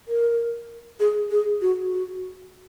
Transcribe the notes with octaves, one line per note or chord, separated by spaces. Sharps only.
A#4
G#4
G#4
F#4
F#4